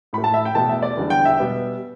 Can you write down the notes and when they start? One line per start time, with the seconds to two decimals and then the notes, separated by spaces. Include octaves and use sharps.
0.13 A2 A3 B5
0.24 A5
0.34 E5
0.45 G5
0.55 E2 B2 A3 A5
0.69 E5
0.82 D5
0.97 E2 D3 G3
1.10 G5
1.25 E5
1.39 B2 G3 B3